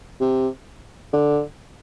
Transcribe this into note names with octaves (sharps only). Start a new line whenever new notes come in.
C3
D3